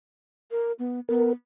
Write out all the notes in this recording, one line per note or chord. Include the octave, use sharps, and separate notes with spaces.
A#4
B3
B3 A#4